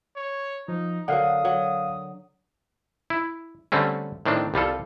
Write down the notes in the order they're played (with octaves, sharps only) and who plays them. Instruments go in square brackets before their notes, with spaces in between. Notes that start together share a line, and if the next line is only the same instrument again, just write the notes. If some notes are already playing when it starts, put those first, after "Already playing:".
[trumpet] C#5
[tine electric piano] F3 [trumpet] D#4
[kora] D3 F#3 [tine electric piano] A#4 F5 F#5 [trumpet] D#6
[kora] F#3
[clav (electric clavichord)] E4
D3 G3 A3 C4 C#4
A2 D#3 C4 D4
C2 G3 F4 A4